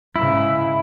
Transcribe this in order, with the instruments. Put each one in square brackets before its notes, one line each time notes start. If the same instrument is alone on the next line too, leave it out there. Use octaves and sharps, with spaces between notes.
[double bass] G#2 C#3 [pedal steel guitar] E4